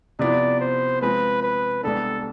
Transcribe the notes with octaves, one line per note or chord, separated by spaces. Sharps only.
C3 F3 B3 E4 D5
C5
F3 G#3 C4 B4
B4
C2 C3 G#3 B3 D4 A4